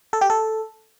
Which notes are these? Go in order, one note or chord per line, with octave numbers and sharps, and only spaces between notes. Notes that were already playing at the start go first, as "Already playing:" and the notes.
A4
G4
A4